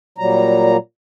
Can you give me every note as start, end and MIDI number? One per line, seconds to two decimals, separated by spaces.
0.18 0.77 46
0.18 0.77 54
0.18 0.77 55
0.18 0.77 82